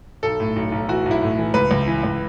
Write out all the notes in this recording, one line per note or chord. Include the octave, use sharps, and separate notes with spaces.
B1 A4
A2
B1
B1
E3 F#4
B1
E4
A2
E3
C#2 B4
C#2
E3
C#2